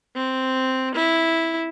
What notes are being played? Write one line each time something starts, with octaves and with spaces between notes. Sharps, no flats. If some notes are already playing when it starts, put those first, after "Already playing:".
C4
E4